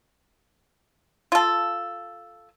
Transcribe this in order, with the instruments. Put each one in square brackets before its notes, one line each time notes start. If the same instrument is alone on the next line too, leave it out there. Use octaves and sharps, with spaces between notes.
[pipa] F4 A4